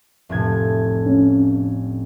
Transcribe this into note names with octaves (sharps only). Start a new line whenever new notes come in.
F1 A2 G#6
C#4